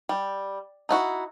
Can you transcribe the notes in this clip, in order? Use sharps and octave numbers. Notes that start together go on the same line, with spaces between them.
G3
D#4 E4 F#4